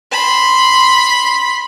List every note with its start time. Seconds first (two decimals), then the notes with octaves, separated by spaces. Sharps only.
0.12 B5 C6